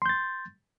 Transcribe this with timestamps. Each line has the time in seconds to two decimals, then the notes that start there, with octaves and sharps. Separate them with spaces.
0.02 C6
0.06 G6
0.09 A6